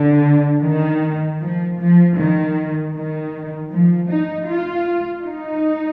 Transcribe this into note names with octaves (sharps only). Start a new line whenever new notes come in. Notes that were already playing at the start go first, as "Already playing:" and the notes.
Already playing: D3
D#3
F3
F3
D#3
D#3
F3
D#4
F4
D#4